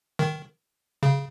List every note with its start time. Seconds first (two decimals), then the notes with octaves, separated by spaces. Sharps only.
0.19 D#3
1.03 C#3